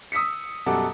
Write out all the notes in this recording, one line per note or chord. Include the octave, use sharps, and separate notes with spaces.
D#6 E6 B6 C#7
F#2 B2 G3 A4 F#5 D6